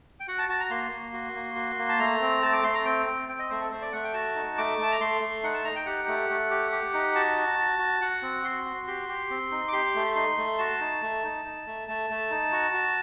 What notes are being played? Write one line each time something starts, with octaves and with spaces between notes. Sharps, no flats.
G5
F#4 F#5
A5
F#4 A5
A#5
A#3 C6
A#3
F#4
A#3
F#4
A#3
A5
A3 A#5
C4
A3 A5
D6
A3 C6
A#5
C4 G5
C4
C4 G5
D#5
A3 C5
A4
A3 C5
D5
A3 F#5
G5
F#4 A5
D#4
A3 D6
A3 A5
A#5
A3 C6
A3
D#4 F#5
A5
D#4 A#5
G5
G4 F#5
A3
A3
G4
G4
D#4
F#4 A5
F#4
F#4
F#4
F#4 F#5
C4
F#4 C6
F#4
G4 C6
G4
C4
D#4
D6
G4 C6
A3
D#4 C6
A3
F#4 A5
D#4
A3
D#4
D#4
A3
A3 A5
A3
D#4
F#4
F#4